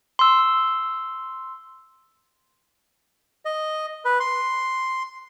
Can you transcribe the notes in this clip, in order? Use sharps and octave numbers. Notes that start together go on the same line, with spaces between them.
C6 E6
D#5
B4
C6